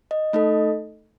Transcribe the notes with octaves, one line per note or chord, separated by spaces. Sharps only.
D#5
A3 D#4 A4 D#5